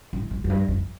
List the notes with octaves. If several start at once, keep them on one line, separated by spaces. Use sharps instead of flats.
A2
G#2
F#2
G2
F2